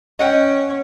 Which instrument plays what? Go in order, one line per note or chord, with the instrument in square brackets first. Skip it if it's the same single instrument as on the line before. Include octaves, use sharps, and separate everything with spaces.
[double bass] C#4 [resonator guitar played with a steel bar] D#5 F#5 G5